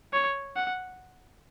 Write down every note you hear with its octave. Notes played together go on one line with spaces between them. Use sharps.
C#5
F#5